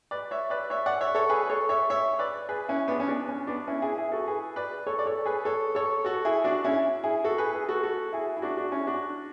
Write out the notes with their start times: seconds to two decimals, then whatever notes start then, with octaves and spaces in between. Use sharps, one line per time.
0.11 B4 D5
0.31 C#5 E5
0.50 B4 D5
0.70 C#5 E5
0.86 D5 F#5
1.01 C#5 E5
1.15 A4 C#5
1.29 G#4 B4
1.49 A4 C#5
1.69 C#5 E5
1.90 C#5 E5
2.19 B4 D5
2.49 G#4 B4
2.69 C#4 E4
2.88 B3 D4
3.00 C#4
3.08 B3 D4
3.29 C#4
3.47 B3 D4
3.67 C#4 E4
3.82 E4 G#4
3.97 E4 G#4
4.12 F#4 A4
4.28 G#4 B4
4.56 B4 D5
4.87 A4 C#5
4.99 D5
5.06 A4 C#5
5.25 G#4 B4
5.45 A4 C#5
5.75 A4 C#5
6.05 F#4 A4
6.25 E4 G#4
6.44 D4 F#4
6.64 C#4 E4
7.04 E4 G#4
7.24 F#4 A4
7.38 G#4 B4
7.53 G#4 B4
7.69 F#4 A4
7.83 F#4 A4
8.13 E4 G#4
8.37 E4
8.42 D4 F#4
8.57 D4 F#4
8.72 C#4 E4
8.87 D4 F#4